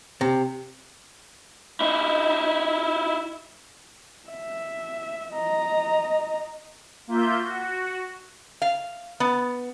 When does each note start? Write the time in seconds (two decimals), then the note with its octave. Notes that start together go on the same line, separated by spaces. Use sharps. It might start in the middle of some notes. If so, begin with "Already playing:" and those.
0.21 C3
1.80 D#4 E4
4.29 E5
5.33 D#5 A#5
7.07 A#3 F4 E5 G6
7.39 F#4
8.62 F5
9.20 B3